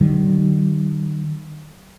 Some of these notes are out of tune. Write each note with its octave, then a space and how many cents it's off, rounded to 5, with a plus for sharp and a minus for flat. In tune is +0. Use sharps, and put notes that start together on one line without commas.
D#3 -35 G3 -45